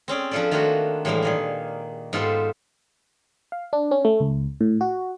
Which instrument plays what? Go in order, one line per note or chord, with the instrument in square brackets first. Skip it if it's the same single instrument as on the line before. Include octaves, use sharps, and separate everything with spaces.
[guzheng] C4 C#4 G#4 D5
F3 D4 F4 A4 B4 D5
D#3 A3 A#3 D4 F4 F#4
A2 E3 G3 G#3 A#3 E4
A#2 D#3 G#4
G#2 B3 F4 G4 A4 C5
[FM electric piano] F5
D4
C#4
A3
C#2
A2
F#4